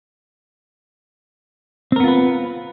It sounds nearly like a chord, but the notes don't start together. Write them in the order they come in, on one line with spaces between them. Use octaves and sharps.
C4 A#4 B3 F4 B4